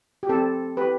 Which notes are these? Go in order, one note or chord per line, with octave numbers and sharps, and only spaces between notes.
G4
C4 A4
G4 B4